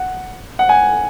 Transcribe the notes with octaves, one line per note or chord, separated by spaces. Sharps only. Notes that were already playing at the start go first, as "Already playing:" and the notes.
Already playing: F#5
F#5
G#5